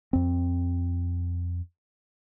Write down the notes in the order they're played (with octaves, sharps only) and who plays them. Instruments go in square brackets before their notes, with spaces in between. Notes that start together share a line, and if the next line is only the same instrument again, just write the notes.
[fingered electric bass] F2 C4